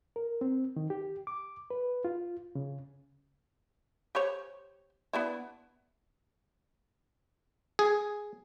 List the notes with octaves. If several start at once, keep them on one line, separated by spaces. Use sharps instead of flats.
A#4
C4
D#3
G4
D6
B4
F4
C#3
G4 C5 C#5
B3 D4 E4
G#4